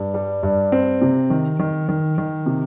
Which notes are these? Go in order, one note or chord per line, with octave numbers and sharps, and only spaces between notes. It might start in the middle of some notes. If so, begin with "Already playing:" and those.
Already playing: G2
G3
G2
C4
C3
D#3
D#3
D#3
D#3
C3